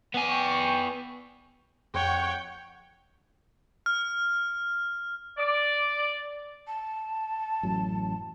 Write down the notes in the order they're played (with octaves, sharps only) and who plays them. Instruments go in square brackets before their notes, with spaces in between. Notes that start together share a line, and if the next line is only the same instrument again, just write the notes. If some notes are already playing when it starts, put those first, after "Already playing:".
[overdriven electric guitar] B3 G#5
[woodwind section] G5 C#6
[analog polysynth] F2 F#5 C#6 [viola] C#5 G5
[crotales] F6
[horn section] D5
[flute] A5
[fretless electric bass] A1 F#2 F#3